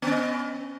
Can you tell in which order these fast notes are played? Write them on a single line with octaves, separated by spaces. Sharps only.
B3 C#4 D#5